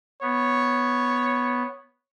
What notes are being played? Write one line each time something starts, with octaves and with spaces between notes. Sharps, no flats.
B3 C#5